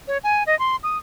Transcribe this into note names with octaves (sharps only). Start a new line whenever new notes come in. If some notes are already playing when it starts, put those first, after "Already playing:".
C#5
G#5
D#5
C6
D#6